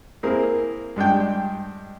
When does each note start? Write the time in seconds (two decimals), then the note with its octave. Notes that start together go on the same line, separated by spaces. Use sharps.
0.23 A#3 C4 E4 G#4 A#4
0.96 G2 G#3 D4 G5